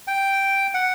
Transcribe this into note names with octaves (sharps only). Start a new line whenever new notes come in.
G5
F#5